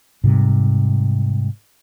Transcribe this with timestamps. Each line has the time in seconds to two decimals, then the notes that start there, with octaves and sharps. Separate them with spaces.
0.24 G#2 C3 G3